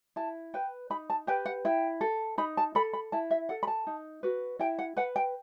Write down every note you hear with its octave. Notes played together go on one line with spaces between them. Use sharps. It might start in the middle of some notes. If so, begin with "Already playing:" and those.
E4 A5
B4 G5
D#4 B5
A5
G4 B4 G5
F#5
E4 G5
A4
D#4 B5
A5
A4 B5
B5
E4 A5
E5
A4 F#5
B5
A5
D#4
F#4 B4
E4 G5
F#5
B4 F#5
G5